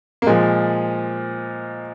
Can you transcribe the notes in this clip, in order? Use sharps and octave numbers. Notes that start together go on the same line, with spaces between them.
A#3
A#2 F3 G#3